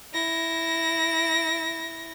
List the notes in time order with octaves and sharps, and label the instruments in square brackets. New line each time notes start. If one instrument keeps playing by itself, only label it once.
[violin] E4 A#6